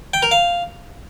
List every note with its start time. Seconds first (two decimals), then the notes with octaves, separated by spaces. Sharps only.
0.14 G5
0.23 A#4
0.31 F5